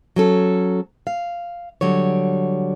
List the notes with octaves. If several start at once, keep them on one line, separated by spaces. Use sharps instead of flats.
F#3 C#4 A4
F5
D3 F#3 G3 C#5